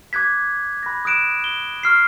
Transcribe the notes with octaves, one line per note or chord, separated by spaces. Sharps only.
D6 F#6 G#6 B6
B5 F#6 A#6
D#6 F#6 D7 E7
G7
C#6 F6 C7